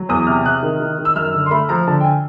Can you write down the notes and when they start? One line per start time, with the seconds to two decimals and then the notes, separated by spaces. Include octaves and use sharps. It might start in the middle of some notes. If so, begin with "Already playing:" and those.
Already playing: F#3
0.09 E2 D#6
0.27 C3 F6
0.45 C3 F#6
0.63 D#3
0.80 D#3
0.98 D#3
1.05 E6
1.15 F#2 F6
1.34 D3
1.46 C6
1.51 A3 B5
1.69 F3 A#5
1.87 D3 A5
2.00 G5
2.04 G#5